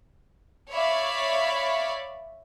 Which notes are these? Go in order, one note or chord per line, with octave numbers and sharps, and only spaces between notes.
C#5 D5 E5 F5 B5